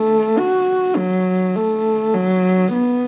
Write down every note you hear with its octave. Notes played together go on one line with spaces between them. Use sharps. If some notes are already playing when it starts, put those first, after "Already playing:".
Already playing: A3
F#4
F#3
A3
F#3
B3